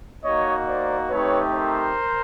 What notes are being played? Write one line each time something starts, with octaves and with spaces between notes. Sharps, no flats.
A#3 D#4 F#4 C#5 D#5
C5 D5
A3 C4 D#4 G4 B4 C#5
A#4 C5